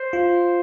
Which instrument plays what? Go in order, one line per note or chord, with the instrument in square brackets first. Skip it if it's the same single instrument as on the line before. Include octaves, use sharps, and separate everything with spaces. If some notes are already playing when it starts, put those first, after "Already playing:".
Already playing: [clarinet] C5
[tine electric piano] F4